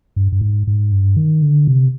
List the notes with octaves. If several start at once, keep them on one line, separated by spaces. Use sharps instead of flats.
G2
G2
G#2
G#2
G2
D#3
D3
C3